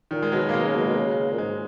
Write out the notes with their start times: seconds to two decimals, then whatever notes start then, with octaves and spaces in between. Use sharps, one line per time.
0.11 A#2 D#3
0.22 G#3
0.32 B2 F#3
0.49 A#3
0.54 B2 G#3
0.64 C#3
0.75 B2
0.86 B2
0.96 C#3
1.31 A#2
1.38 G#2 G#3